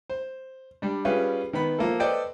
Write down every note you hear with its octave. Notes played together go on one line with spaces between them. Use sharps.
C5
G3 D4
G3 C#4 F4 G#4 B4
D#3 B3 B5
F3 A#3 A4
A4 B4 C5 D5 D#5 G5